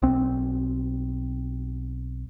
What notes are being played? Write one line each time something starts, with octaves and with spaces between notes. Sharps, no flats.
B1 C4